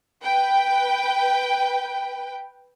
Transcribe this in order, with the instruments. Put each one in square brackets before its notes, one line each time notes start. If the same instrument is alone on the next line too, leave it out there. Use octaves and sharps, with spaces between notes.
[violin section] B4 G5